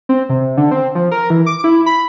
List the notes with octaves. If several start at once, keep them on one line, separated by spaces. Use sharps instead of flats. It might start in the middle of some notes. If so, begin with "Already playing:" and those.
C4
C3
D3
C4
F3
A#4
E3
D6
E4
B5